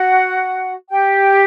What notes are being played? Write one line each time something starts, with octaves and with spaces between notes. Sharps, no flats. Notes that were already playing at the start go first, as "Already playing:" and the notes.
Already playing: F#4 F#5
G4 G5